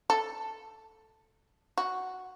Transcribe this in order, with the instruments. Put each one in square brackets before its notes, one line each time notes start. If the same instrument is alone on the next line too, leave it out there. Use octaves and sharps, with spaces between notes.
[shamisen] A4
F#4